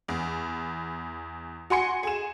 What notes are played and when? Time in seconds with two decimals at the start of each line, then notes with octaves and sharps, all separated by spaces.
0.08 E2
1.70 F#4 G#5 C6 C#7
2.03 G#4 E7